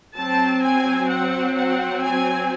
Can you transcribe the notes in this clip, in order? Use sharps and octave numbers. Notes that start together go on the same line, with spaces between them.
F#3 C4 A5
G#5
F#5
F#5
G#5